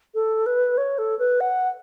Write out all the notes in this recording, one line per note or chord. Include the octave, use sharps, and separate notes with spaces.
A4
B4
C#5
A4
B4
F#5